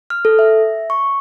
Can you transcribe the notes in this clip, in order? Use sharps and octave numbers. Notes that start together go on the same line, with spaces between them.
F6
A4
E5
C#6